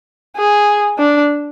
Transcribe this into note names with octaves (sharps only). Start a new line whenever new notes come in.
G#4
D4